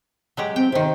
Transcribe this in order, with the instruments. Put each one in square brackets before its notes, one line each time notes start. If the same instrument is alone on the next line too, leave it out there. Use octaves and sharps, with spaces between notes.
[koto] F#3 G#3 G4
[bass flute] C4 [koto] G5
[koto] C3 D#3 [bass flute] C5